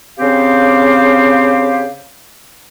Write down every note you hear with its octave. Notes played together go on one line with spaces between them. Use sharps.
C#3 C4 G4 C5 F5